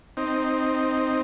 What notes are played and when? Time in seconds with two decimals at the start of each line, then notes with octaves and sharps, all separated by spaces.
0.17 C4 D#4